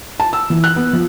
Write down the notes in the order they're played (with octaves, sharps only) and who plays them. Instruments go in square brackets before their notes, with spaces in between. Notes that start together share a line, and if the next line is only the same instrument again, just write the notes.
[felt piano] A5
E6
E3
F#6
B3
F3